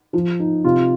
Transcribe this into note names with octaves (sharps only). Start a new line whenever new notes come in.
F3
D#4
C3 F4